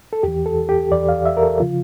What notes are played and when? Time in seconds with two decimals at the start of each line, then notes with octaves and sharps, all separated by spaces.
0.13 A4
0.23 E2 E3 G4
0.46 A4
0.69 G4
0.91 E2 E3 D5
1.09 F5
1.25 E5
1.37 A#4
1.43 A4
1.60 C#3 F3 F4